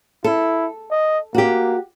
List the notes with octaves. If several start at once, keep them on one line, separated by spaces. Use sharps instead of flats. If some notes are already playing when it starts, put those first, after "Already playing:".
E4 A4
D#5
A#3 F#4 G4